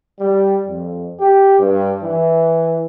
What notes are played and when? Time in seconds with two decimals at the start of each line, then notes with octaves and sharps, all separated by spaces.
0.20 G3
0.67 F2
1.19 G4
1.59 G2
2.03 E3